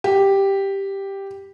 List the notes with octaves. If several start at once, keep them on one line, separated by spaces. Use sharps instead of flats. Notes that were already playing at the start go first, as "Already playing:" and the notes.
G4